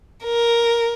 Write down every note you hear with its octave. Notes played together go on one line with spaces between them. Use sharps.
A#4